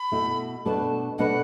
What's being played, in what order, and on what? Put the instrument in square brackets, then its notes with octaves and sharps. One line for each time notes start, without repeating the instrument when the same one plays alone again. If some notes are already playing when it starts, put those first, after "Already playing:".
Already playing: [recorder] B5
[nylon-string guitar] B2 A3 E4
[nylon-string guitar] B2 A3 D4 B4 [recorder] A5
[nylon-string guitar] B2 A3 D4 B4 [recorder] F#5